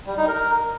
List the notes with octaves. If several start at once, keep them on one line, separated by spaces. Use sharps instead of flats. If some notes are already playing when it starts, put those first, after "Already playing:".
G3
D#4
A#4